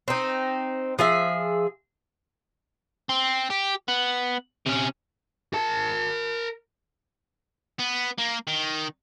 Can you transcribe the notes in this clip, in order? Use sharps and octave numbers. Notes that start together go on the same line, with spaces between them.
C4 D#4
F3 G#4 E5
C4
G4
B3
C3 C#4
A#4 A5
B3
A#3
D#3